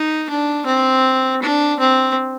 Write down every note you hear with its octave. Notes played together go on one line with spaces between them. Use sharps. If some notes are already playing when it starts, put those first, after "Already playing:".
Already playing: D#4
D4
C4
D4
C4